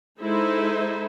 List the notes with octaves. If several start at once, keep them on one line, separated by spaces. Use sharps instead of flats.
G#3 D#4 E4 A4 C5 E5